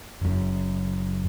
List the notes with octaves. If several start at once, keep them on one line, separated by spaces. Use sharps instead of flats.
F#1 F#2